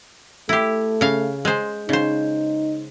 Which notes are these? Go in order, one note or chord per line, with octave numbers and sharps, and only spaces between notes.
A3 E4 G4
C#3 F5
G#3 C5
C#3 D#4 C5